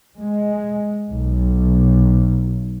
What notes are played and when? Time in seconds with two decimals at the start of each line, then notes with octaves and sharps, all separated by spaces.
0.19 G#3
1.09 B1